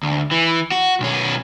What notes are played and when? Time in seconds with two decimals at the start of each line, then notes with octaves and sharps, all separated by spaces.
0.03 D2
0.31 E3
0.72 F#4
1.00 B1 C#4